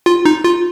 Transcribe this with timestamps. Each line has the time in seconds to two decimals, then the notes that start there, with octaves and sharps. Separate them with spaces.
0.06 F4
0.25 D#4
0.44 F4